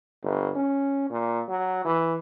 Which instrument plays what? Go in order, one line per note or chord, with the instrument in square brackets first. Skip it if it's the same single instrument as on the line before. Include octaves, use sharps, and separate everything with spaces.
[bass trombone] G1
C#4
A#2
F#3
E3